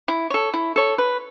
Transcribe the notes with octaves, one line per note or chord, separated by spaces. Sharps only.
E4
A4 C#5
E4
A4 C#5
B4